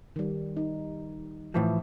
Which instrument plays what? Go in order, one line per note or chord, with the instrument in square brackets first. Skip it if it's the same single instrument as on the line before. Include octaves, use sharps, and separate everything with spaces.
[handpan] D#3 G3
D#4
[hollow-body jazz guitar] A2 E3 F3